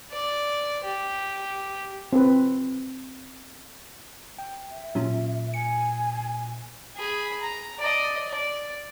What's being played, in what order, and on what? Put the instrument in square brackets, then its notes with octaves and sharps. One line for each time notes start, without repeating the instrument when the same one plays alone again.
[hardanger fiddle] D5
G4
[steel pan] C4 B4
[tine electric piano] G5
[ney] E5
[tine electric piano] A#2 [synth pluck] F#3 C#4 F4
[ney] G#5 [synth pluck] C#7
[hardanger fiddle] G#4 B5
A#5
D5 D#5
D5